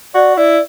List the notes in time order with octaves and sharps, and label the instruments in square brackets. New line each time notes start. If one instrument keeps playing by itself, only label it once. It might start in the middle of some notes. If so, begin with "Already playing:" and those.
[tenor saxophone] F#4 [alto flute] D5
[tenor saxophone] E4 [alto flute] D5